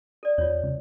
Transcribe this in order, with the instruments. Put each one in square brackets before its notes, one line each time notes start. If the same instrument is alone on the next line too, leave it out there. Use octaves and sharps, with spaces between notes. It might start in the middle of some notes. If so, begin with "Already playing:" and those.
[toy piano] A4 D5
[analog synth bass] E2 [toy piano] F4 C#5
[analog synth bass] C#2